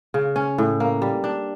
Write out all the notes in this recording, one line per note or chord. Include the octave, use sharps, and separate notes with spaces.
C#3
C#4
A2
A#3
G3
D4